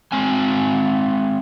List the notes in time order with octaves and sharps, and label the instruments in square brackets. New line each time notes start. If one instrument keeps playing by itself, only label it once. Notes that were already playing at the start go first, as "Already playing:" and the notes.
[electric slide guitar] G#3 C4 G#5